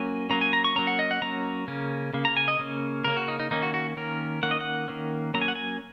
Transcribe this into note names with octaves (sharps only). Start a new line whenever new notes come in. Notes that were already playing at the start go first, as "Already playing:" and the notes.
Already playing: F#3 A#3 C#4 G#5
F#3 A#3 C#4 A#5
G#5
A#5
C#6
F#3 A#3 C#4 A#5
F#5
D#5
F#5
F#3 A#3 C#4 A#5
C#3 A#3 C#4
C#3 A#3
A#5
G#5
D#5
C#3 A#3 C#4
C#3 A#3 C#4 A#4
F#4
D#4
D#4
D#3 A#3 C#4 D#4
F#4
F#4
D#3 A#3 C#4 A#4
D#3 A#3 C#4 F#5
D#5
F#5
D#3 A#3 C#4
F#3 A#3 C#4 A#5
G#5
F#5
G#5